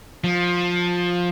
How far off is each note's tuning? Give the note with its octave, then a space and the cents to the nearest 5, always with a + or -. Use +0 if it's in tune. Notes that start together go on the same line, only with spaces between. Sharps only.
F3 +15